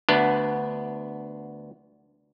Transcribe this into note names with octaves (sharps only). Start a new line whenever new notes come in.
D2 B3 D4